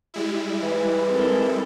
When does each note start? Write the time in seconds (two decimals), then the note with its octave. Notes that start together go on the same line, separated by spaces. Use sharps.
0.14 G3 G#3 E4
0.62 G#2 E3
1.08 C4 A4 A#4